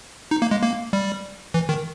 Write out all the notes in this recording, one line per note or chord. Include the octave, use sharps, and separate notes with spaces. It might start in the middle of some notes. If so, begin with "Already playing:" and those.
D#4
A#3
G#3
A#3
G3
E3
D#3